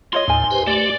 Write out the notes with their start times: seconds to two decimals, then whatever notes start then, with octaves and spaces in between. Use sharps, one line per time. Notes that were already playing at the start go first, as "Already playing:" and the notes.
0.13 F4 C#5 D#5 C6
0.28 D#2 A2 D#4 A#4 G#5
0.51 G4 B4 C5
0.67 A3 G4 D5